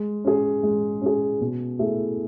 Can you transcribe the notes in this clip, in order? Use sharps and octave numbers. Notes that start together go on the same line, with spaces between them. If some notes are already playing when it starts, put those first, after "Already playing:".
Already playing: G#3
C#4 G#4
G#3
C#4 G#4
B2
A3 E4 G#4